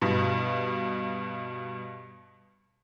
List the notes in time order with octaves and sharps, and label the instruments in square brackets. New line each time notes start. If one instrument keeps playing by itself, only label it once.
[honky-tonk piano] G2 B2